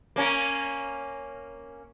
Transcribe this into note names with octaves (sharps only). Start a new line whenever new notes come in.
A#3 C#4 A#4